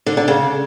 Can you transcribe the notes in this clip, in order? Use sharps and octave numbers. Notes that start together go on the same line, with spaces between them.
D3
D3
C#3